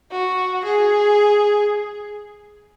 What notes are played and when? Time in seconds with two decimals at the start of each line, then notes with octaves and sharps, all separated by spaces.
0.11 F#4
0.65 G#4